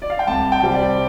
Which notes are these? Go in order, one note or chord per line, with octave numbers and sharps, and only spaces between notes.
D5
F5
G5
C2 A5
G5
C3 G3 C4
D5